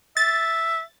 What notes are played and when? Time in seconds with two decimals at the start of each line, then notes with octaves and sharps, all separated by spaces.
0.17 E5 A6